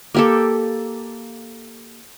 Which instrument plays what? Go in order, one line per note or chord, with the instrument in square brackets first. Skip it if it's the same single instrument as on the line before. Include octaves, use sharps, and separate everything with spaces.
[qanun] A#3 G4 A4